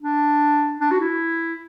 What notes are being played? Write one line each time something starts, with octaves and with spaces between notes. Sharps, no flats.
D4
D4
F#4
E4